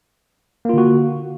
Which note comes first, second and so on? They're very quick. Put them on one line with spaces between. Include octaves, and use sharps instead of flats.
A#3 F4 D3 F#4